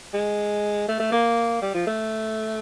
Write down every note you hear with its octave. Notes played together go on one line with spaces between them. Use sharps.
G#3
A3
A3
A#3
G3
F3
A3